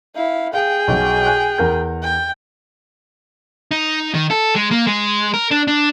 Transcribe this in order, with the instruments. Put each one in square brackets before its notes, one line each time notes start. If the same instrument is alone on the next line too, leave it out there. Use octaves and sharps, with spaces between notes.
[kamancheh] E4 F5
[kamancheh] G#4 G5 [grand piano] F5
[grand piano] B1 B2
G#5 F#6
E2 A#4 G6
[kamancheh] G5
[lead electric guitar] D#4
D#3
A4
G#3
A#3
G#3
A#4
D4
D4